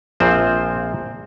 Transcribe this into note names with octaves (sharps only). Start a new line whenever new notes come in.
A#1 A#2 F3 C4 C5